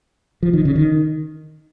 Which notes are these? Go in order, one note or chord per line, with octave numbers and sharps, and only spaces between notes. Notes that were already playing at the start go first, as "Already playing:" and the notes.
F3
D#3
C#3
D#3